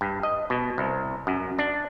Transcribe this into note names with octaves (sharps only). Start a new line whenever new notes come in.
G2
D#5
B2
C2
F#2
D4